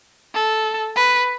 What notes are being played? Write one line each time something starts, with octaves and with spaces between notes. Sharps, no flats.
A4
B4